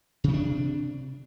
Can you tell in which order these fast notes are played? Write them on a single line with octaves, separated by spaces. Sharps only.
C3 C#4 D4